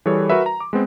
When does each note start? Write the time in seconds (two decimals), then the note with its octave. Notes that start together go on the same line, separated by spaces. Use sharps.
0.06 E3 G3 G#4 A4 C#5
0.30 F#4 A#4 B4 E5
0.46 A#5
0.60 D6
0.73 G#3 B3 C4